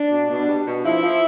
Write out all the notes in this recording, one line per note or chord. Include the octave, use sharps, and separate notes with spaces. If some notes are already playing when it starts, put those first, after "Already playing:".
Already playing: D4
B2
B2
G3
B2
F3 E4
F3